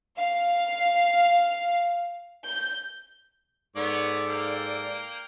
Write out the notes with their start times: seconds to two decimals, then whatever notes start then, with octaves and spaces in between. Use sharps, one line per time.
0.17 F5
2.44 G6
3.76 G#2 B3 A4 C#5 D5
4.29 A#3 G5